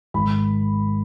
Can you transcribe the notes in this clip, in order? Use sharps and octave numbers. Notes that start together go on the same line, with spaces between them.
G#1 B5